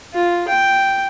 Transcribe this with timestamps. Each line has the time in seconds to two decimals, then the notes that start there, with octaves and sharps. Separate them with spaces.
0.14 F4
0.48 G5